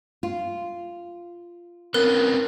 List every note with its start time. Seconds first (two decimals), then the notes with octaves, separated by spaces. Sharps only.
0.23 F4
1.94 C4 C#4 A#4 B4 F#6